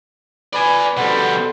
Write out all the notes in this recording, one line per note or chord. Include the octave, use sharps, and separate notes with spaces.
B4 D5 G#5
B2 G3 A4 C5 F#5